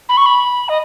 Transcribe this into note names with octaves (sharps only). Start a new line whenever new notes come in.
B5
C#6
B5
D#5